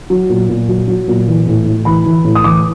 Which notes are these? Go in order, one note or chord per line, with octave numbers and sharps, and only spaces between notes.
F#3
A#2
A#2
F#3
F#3
A#2
E3
A2
A2
E3 B5
E3
A2
D#6
E3 D6